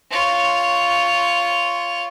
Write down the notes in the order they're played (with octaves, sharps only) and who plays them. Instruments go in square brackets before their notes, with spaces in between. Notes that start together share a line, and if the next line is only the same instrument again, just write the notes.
[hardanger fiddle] F4 C#5